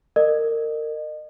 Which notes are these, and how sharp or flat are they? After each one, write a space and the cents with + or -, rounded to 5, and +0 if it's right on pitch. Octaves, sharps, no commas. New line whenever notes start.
A#4 -25 D#5 -35